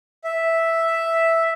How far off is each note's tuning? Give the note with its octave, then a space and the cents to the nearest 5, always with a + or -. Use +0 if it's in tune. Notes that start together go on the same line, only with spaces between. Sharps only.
E5 +0